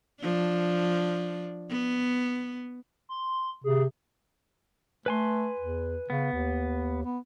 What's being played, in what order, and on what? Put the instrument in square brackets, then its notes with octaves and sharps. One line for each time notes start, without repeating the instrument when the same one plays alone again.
[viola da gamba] F3 D4
B3
[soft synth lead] C6
[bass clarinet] C3 [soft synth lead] G#4
[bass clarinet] A3 [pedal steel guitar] B4 G#5 C6
[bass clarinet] E2
[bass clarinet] C#3 [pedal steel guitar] B3
[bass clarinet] D#2
B3